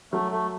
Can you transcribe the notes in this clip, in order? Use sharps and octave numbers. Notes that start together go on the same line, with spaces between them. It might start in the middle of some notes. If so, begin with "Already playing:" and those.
F#3 A3
A3